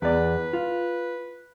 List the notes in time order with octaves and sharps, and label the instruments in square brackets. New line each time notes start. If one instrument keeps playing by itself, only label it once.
[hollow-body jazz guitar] E2 D5 [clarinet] B4
[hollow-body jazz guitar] F4